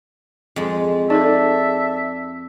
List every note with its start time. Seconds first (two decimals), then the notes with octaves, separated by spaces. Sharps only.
0.56 F2 G#3
1.10 D#4 G#4 A4 D5 E5 A5